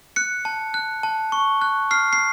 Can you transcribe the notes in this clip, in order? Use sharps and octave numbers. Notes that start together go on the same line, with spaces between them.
F#6 C#7
A5
F#6
A5
C#6
F#6
F6 C7
C7